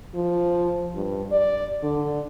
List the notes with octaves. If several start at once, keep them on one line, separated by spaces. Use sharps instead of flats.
F3
G2
D5
D3